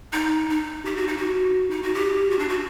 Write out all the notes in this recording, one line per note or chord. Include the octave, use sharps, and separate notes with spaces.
D#4
D#4
G4
F#4
D#4
F#4
D#4
F#4
G4
F#4
D4
F#4